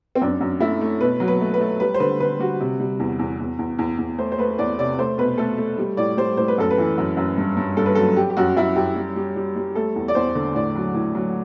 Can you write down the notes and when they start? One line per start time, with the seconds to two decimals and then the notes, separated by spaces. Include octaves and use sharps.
0.15 C4
0.21 F#2 D4
0.41 F#2
0.60 A3 E4
0.81 A3
1.01 B2 B4
1.20 F#3
1.28 B4
1.41 A3
1.54 B4
1.61 A3
1.80 G3 B4
1.94 C5
2.00 D3 B4
2.20 D3 B4
2.39 G3 F#4
2.60 C3
2.80 G3
3.00 E2
3.19 E2
3.40 E2
3.59 E2
3.79 E2
3.98 E2
4.18 A3 C5
4.32 C5
4.38 A3 B4
4.59 E2 D5
4.79 C3 D5
4.99 A3 C5
5.18 B2 B4
5.38 A3 A4
5.58 A3
5.78 G3
5.97 A2 D5
6.17 G3 C5
6.37 A2 C5
6.48 B4
6.58 F#2 A4
6.71 B4
6.78 E3
6.98 F#2
7.17 F#2
7.38 G2
7.57 G2
7.77 G2 A4
7.86 B4
7.95 F#3 A4
8.16 G3 G4
8.30 G4
8.37 F#2 F#4
8.56 F#2 E4
8.76 F#2 G4
8.96 G3
9.16 G3
9.36 G3
9.56 G3
9.75 A3 A4
9.96 E2
10.08 D5
10.15 E2 C5
10.35 D3
10.55 A2 D5
10.75 F#3
10.94 A2
11.15 F#3